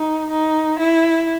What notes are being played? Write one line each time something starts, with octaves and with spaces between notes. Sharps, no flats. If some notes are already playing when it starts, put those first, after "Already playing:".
Already playing: D#4
D#4
E4